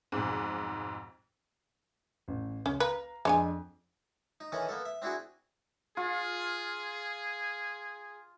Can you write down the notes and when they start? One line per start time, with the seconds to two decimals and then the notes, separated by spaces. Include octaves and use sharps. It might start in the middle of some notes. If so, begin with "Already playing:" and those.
0.12 B1 F2 G#2
2.28 A1
2.66 C#2 C#4
2.80 B4 F5 A#5
3.25 F2 G#3 D4 C#5 G#5 C6
4.40 D#4
4.52 D#3 E3 C#4 D#4 A4
4.69 A#3 B3 A4
4.86 E5
5.02 C4 D4 E4 F#4 G#4
5.97 F4 G#4